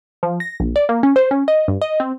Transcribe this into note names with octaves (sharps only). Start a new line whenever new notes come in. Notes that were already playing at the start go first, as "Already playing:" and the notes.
F3
A#6
A#1
D5
A#3
C#4
C5
C#4
D#5
G2
D#5
C4